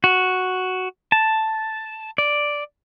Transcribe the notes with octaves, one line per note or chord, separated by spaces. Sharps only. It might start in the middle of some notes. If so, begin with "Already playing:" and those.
F#4
A5
D5